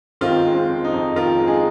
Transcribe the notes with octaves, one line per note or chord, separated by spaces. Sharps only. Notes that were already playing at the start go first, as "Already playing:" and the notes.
D#3 C4 F4
G#3
C4
F2
D#4
F2
D#3 F4 A#4
G#3
D#4 G#4